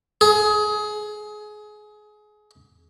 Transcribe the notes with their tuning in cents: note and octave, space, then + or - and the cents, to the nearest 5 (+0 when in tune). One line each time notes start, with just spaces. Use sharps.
G#4 +25